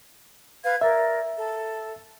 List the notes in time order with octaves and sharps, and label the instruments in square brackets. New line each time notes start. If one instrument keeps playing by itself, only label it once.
[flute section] B4 F5 G#6
[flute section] A#4 D5 [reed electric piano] E5
[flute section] A4